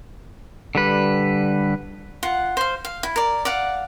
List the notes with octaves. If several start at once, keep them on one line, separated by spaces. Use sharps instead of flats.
D3 G3 B4
F4 F#5
C5 F5
F5
E4
A#4 D5
D5 F5 F#5